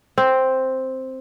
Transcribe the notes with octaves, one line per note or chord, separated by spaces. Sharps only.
C4